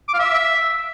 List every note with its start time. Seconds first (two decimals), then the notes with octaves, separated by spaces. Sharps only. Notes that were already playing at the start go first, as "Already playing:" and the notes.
0.08 D6
0.13 F5
0.19 E5